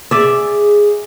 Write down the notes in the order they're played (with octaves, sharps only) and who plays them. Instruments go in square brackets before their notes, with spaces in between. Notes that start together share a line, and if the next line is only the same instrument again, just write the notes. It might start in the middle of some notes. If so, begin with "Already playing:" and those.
[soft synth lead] G#4 [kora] D5 E5